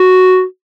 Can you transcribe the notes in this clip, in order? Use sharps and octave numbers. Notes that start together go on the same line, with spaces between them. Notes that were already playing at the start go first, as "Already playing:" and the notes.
Already playing: F#4